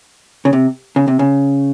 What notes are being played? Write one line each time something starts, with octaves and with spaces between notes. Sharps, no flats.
C#3
C3
C#3
C3
C#3